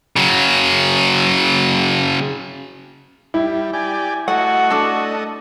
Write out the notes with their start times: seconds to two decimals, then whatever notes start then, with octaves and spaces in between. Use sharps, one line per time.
0.16 C#3 F#3
3.34 G3 E4
3.73 G4 D5 G#5
4.28 A3 F#4 D#5 F#5
4.70 D4 A4